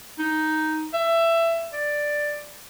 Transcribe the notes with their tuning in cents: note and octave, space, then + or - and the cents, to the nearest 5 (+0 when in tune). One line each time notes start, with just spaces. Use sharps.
D#4 +5
E5 +20
D5 +5